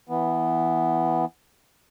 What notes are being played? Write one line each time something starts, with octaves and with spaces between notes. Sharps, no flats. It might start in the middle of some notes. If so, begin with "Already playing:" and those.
E3 B3